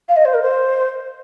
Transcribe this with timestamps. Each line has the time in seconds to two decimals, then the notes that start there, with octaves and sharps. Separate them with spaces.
0.08 F5
0.16 D#5
0.25 C5
0.34 A#4
0.42 C5